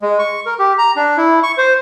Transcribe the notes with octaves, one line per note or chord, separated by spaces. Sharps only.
G#3
C#6
A#4
G4
A#5
D4
E4
C#6
C5